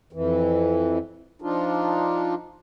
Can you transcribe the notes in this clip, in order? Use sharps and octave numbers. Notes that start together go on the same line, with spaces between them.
F2 E3
F3 D4 D#4 F4